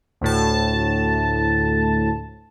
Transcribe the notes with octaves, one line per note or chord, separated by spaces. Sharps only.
D2 A2 A5